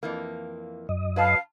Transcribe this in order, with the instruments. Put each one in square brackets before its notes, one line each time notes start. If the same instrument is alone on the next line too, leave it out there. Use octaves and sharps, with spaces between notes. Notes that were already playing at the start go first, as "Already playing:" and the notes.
[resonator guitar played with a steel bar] F2 E3 A#3
[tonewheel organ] F#2 D#5
[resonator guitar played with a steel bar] F#3 B4 A5 [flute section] F5